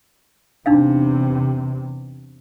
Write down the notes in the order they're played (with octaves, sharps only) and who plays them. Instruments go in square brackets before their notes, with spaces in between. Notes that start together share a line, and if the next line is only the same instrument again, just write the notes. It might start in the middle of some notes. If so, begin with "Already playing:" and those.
[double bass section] E2 C3 [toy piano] D4 D#4 F5